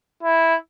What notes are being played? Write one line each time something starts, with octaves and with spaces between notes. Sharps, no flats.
E4